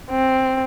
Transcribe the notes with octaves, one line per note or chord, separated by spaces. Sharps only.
C4